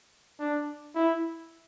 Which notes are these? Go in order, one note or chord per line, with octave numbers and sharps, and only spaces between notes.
D4
E4